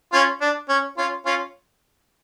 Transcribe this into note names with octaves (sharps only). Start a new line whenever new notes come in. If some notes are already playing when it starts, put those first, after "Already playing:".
C#4 F4
D4
C#4
C#4 F4
C#4 F4